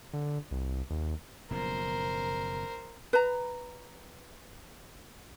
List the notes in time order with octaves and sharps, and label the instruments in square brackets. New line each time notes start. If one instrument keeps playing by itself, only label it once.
[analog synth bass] D3
C2
D#2
[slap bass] F#1 B2 F3 [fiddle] A#4 C5
[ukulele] B4 A#5